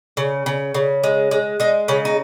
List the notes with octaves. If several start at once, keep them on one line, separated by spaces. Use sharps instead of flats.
C#3
C#3
C#3
G#3
G#3
G#3 D#4
C#3 C#4
D#4